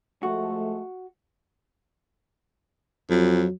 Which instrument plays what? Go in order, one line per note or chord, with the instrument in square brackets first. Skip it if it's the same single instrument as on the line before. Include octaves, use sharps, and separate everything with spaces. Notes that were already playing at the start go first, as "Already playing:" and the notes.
[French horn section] F3 G#3 A3 [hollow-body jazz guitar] F#4
[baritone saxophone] F2 [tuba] F#3